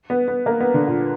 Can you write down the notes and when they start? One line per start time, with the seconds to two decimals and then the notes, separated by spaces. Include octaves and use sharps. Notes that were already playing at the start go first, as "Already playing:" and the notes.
0.10 B3
0.28 B3
0.46 A#3
0.60 B3
0.74 D3
0.87 A#2